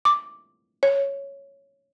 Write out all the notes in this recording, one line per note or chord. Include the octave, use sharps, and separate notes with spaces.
D6
C#5